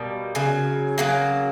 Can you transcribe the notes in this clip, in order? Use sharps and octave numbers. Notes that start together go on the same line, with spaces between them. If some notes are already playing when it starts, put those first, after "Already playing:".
Already playing: B2 G3 A#3
C#3 F#3
C#3 F#3 A#3